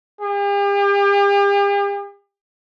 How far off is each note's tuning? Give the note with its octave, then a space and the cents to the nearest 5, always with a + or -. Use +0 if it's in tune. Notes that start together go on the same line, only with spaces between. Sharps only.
G4 +45